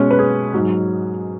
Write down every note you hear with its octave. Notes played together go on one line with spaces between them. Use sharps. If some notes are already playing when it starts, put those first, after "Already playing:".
Already playing: B2 G#3 C#4
B4
G#4
G#2 F#3